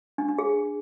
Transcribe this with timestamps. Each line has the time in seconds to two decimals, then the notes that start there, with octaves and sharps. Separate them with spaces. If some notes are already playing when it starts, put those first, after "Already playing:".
0.18 D4
0.28 D4
0.39 G#4